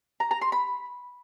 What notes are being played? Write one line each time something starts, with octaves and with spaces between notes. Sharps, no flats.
A#5
A#5
C6
B5